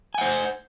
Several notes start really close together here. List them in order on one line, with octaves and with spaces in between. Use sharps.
G#5 F#5 C5